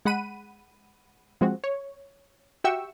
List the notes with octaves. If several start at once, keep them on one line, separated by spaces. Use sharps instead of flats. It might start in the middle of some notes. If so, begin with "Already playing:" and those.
G#3 F#5 B5 D#7
F3 G#3 C4 F#4
C#5
F#4 G4 E5 G5 C#6 E6